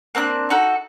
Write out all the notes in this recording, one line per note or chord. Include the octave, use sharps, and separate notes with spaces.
A#3 C4 D4 F#6
D#4 F#4 A4